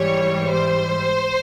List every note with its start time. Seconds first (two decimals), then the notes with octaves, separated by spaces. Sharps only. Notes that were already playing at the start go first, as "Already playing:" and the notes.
Already playing: G#2 E3 G3 C#5
0.52 C5